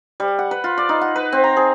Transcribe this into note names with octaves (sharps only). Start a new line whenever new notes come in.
G3
F#5
B4
F4
D5
D#4
F#5
B4
C4
A#5
G#4